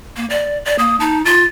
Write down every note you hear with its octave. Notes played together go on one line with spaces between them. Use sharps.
A#3
D5
D5
A#3 D#6
D#4 A5
F4 A6